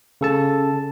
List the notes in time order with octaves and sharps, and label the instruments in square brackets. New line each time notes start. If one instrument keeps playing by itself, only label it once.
[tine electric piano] C#3 A4 A5